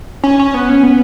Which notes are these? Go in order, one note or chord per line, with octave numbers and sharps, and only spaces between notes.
C#4
C#4
B3
C#4
B3